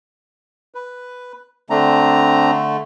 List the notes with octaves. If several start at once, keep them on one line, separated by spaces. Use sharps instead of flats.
B4
D3 A3 C4 D4 A#5